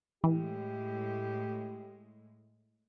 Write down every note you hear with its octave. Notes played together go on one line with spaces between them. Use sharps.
A2 E3 G#3 G4